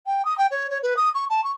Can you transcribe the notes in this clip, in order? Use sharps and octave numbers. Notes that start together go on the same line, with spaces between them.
G5
D#6
G5
C#5
C#5
B4
D#6
C#6
A5
C#6